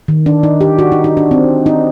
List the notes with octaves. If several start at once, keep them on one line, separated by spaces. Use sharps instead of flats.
D#3
D4
D#4
G4
F#4
D#4
D#4
D4
C4
D#4